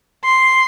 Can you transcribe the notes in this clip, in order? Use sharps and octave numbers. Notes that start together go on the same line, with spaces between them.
C6